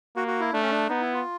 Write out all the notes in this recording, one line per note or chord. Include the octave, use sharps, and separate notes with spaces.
A#3 F#4
F#4
E4
A3 D4
C#4
D4
B3 D#4
E4
F4